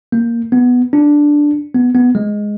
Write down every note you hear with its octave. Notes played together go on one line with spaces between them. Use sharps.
A#3
B3
D4
B3
B3
G#3